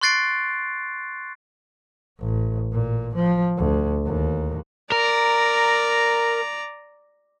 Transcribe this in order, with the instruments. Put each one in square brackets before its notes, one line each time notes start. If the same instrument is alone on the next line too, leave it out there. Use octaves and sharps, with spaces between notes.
[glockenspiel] C6 C#6 F#6 A6 C7 D7
[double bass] A1
A#2
F3
D2
D#2
[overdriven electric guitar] A#4 [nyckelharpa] D5 A#5